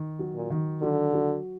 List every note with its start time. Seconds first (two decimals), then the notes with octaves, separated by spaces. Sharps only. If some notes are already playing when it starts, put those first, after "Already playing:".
Already playing: D#3
0.19 F#3
0.35 A#2
0.50 D#3
0.82 D3 F#3
1.13 F#3